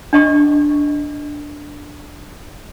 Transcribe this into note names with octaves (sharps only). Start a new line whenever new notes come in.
D4 D#5 C#6